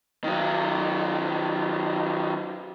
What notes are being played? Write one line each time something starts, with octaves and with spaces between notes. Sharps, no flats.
D#3 F#3